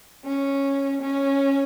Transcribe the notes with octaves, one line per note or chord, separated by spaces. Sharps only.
C#4
C#4